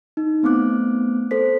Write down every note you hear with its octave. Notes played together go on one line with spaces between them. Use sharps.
D#4
A3 B3 C4 D6 F#6
A4 C5 B6